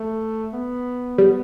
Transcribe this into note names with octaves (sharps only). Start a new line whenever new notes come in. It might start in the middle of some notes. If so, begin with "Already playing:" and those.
Already playing: A3
B3
G3